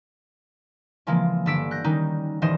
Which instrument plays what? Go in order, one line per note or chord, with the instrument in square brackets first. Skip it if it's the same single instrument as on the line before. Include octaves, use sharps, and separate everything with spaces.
[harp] C#3 E3 F3 G#3 A#3
G1 D3 A4 E6 B6 D7
F#6 G6 A#6
D#3 G3 C#4 D#4
D#1 D#3 E3 C5 D#5 E7